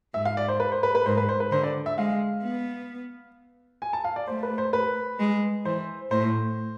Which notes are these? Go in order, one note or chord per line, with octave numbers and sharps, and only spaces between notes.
G#2 E5
F5
D5
C5
B4
C5
B4
B4
G#2 C5
B4
C5
B4
D3 C5
D5
E5
G#3 F5
B3
G#5
A5
F5
D5
A3 C5
B4
C5
B4
G#3
E3 C5
A2 C5